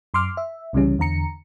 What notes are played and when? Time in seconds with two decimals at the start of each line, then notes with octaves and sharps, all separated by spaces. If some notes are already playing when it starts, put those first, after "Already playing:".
0.14 F#2 C6 D6 F6
0.37 E5
0.73 C2 C#3 E3 G3 C#4
0.99 E2 D3 A#5 C#7